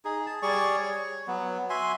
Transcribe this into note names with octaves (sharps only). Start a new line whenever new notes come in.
D#4 G#4
A5
G3 G#4 D5 C#6
C#5
F#3 B3
F#4 E5 G#5 C6